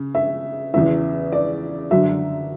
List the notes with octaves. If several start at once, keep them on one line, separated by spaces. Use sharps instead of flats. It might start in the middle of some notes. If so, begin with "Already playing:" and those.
Already playing: C#3
E5
E2 C#3 E3 E5
D5
F#2 D3 F#3 E5